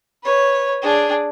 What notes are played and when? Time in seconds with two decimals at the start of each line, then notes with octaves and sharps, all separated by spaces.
0.23 B4 C#5
0.82 D4 G#4